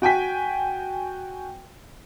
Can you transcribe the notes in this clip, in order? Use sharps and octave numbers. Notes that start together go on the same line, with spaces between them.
F#4 G5 G#5 B6